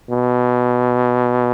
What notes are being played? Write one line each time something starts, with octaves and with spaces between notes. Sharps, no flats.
B2